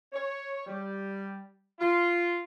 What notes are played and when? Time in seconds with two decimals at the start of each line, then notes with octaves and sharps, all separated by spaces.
0.12 C#5
0.67 G3
1.79 F4